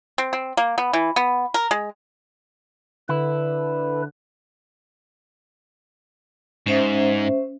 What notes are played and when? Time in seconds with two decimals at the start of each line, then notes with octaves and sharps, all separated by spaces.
0.18 C4
0.33 C4
0.57 A#3
0.78 B3
0.93 E3
1.16 B3
1.54 A#4
1.71 G#3
3.09 D3 E4 B4
6.66 G#2 C#4 C5 E5